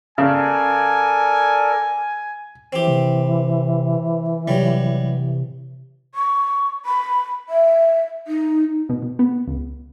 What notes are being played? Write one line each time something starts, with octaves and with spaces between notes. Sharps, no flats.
C#3 A4 A#4 D5 G#5
E3 C4 G4
C3
C3 F#3 G3
C#6
B5
E5
D#4
B2
B2
B3
C#2